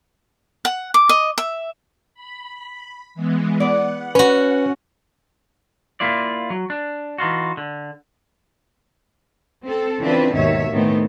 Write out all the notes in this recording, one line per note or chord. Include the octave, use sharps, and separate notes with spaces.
F#5
D6
D#5
E5
B5
E3 G#3 B3
B3 D5 F#5
C#4 F#4 B4
A#3 E4 F4 D5
F#3
D4
E3 D#4 F4 F#4
D3
C4 A4
C#3 E3 C4 D4 F4 B4
D#2 G#2 B2 D#3 C#5 E5
A2 D#3 A3 B3 C4